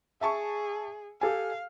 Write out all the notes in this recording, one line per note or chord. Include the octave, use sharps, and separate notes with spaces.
G#4 E5 A5 C#6
G4 A4 F5 G#5